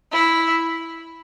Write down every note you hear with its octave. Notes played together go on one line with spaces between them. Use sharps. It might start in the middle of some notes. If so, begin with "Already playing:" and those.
E4